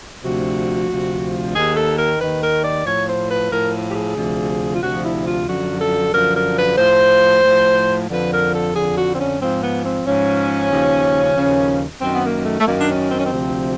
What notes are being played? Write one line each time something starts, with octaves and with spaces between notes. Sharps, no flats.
D2 C3 F3 F#4
D2 C3 F3
D#2 D#3 G#4
A4
A#4
D#2 D#3 B4
A#4
D5
A2 F3 C#5
C5
B4
A2 F3 A#4
G4
G#4
D2 C3 F3
F4
D2 C3 F3 F#4
E4
F4
F#2 D3 F3 F#4
A4
F#2 D3 F3 A#4
A#4
B4
A2 F3 C5
A2 F3
F2 D3 F3 B4
A#4
A4
F2 D3 F3 G#4
F#4
C4
C#4
G#2 F3 C4
B3
C4
G#2 F3 C#4
D#2 C#3 F3
D#2 C#3 F3
F#2 D#3 C4
B3
A#3
A3
A3
F#2 D#3 A#3
D4
C#4
C4
C#4
C4
D2 C3 F3